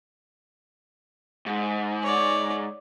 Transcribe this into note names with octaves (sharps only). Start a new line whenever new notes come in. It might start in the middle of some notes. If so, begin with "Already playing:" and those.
G#2
C#5 D5